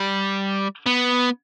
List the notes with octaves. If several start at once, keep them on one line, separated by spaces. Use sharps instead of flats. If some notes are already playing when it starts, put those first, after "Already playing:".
Already playing: G3
B3